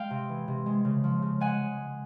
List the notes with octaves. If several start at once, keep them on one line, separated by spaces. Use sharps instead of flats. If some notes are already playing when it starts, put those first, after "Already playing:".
Already playing: G#3 F5 G5
C3
E3
C3
G#3
C#3
F3
C#3
G#3 F#5 G#5